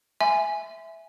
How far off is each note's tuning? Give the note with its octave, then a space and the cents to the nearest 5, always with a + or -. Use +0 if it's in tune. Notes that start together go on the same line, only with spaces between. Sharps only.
E5 +0 G#5 +0 C6 -40